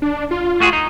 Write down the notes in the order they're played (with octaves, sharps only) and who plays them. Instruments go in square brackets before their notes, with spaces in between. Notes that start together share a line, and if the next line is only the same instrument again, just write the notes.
[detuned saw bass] D4
F4
[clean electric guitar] A3 F#4 G#4
D#4